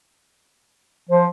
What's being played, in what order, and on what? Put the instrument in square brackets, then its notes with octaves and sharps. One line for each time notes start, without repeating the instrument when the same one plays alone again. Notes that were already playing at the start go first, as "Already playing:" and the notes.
[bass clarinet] F3 [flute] C5